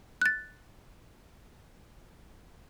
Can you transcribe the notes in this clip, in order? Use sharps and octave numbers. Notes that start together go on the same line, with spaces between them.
F#6 A6